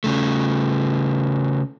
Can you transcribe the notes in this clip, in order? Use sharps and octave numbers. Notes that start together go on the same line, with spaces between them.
C#3 A3